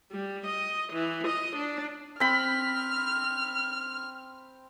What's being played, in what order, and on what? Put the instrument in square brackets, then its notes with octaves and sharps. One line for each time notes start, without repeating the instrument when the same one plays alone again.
[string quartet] G3
D#5
E3
D#5
D4
[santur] C4 B5 [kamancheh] F6